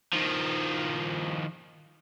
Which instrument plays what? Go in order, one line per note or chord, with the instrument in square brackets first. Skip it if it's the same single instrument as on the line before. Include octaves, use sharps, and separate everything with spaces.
[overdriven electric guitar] D#3 F3